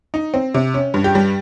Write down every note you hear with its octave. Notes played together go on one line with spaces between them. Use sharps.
D#4
C4
C3
C#4
G2
G4
G3